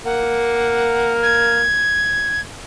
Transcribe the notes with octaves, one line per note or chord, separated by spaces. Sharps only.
A#3 F#5
G#6